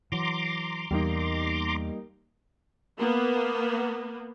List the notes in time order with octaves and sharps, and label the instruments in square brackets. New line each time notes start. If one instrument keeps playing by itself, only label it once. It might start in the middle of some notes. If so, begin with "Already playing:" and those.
[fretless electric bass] E3 F#3 [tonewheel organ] A#5 C6 D6
[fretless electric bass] E2 [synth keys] G3 A#3 D#4
[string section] A#3 B3